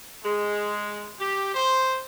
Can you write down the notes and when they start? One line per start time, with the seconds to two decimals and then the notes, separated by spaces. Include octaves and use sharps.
0.22 G#3
1.18 G4
1.54 C5